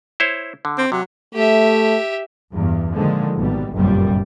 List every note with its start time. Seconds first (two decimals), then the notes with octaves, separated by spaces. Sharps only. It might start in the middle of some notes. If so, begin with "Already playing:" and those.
0.20 E4 C5 C#5
0.65 D3
0.78 C4
0.92 C3 F#3
1.35 A3 G4 E5
2.53 E2 G2
2.93 A#2 D3 D#3 F3 G#3
3.37 G#1 B2 G3
3.72 G1 C2 F#2 A#2 G3